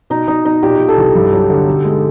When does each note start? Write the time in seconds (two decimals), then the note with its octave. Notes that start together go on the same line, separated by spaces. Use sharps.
0.10 B2 D#4
0.28 B2 D#4
0.45 B2 D#4
0.63 A#2 G4
0.79 A#2
0.89 A4
0.98 C2
1.15 G2
1.33 F#3
1.50 D3
1.66 B2
1.85 G#3